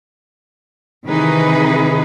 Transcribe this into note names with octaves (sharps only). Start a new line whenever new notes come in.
C3 D#3 E3 D#4 G#4 B4